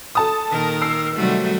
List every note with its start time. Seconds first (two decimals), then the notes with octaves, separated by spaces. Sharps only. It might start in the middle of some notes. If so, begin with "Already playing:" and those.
0.15 A4 A5 D#6
0.49 A#2 D#3 A#4
0.82 E6 C7
1.16 C3 D#3 F#3 G3 A3 F#4